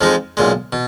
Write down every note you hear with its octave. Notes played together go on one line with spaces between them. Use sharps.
F2 F3 G#3 D#4
B1 A#2 G#3
B2